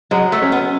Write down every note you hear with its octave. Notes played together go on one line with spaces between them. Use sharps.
F#3 G#3
A3
C#4
B3